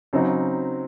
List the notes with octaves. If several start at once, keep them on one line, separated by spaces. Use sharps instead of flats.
C#3 F#3 C4 D#4